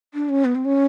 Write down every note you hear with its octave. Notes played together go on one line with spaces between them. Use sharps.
D4
C#4
B3
C4
C#4